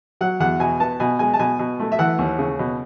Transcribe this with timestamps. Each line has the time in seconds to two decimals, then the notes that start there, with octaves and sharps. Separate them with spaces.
0.21 F#3 F#5
0.40 E2 F#5
0.60 B2 G#5
0.80 B3 A5
1.00 B2 G#5
1.19 G#3 G#5
1.34 A5
1.39 B2 G#5
1.59 B2
1.80 A3
1.92 E5
1.99 E3 F#5
2.19 D#2
2.38 C#3
2.59 B2